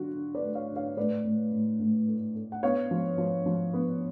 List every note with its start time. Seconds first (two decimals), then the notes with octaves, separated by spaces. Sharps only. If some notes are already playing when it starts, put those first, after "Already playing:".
Already playing: D3 F#3 F4 F#4
0.14 D3
0.35 B4 D5
0.42 A3
0.55 C#5 F5
0.69 D3
0.76 C#5 F5
0.97 A2 B4 D5
1.25 A2
1.52 A2
1.80 A2
2.08 A3
2.35 A3
2.52 F#5
2.63 B3 C#5 F5
2.91 F3
3.18 F3
3.46 F3
3.74 B3